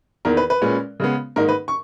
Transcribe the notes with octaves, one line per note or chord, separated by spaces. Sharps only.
E2 D#3 A#3 A#4
B4
B4
A#2 G#3 C#4
C#3 G#3 B3
G#2 D#3 A#3 D#4 A#4
B4
C#6